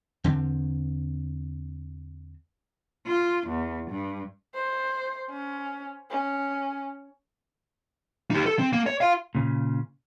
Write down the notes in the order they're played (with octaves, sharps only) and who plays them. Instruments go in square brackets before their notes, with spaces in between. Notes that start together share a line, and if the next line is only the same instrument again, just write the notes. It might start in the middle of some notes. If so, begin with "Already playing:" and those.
[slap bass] E2 D3 C4
[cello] F4
E2
G2
[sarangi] C5
C#4
C#4
[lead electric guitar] D#4 G4
A4
C4
A#3
C#5
F4 F5
[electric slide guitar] A#2 C#3